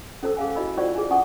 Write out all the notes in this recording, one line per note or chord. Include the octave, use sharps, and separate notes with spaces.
C#4 A4 C5 A5 E6
G#4 F5 G#5
E4 F#4 D#5 B5 E6
F4 C5 D5 D#5 G5 C#6
G#4 G#5
C#4 F#5 G#5 A5 C#6 D#6